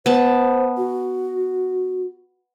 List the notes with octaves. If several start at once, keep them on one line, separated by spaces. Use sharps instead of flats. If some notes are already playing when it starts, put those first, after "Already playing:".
B3 C5 A5
F#4